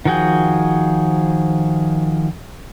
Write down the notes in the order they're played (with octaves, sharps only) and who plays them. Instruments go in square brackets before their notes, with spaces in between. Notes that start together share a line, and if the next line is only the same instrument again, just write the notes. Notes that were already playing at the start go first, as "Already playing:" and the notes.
[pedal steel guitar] D#3 F3 F#4 G#4 G5